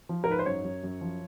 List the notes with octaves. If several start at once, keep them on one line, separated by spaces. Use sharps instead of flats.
F3
A#4
G#2 B4
C5
F#2 C#5
F#2
F#2
F3